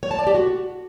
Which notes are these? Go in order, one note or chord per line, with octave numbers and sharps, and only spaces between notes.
C#5
A5
D5
G4
F#4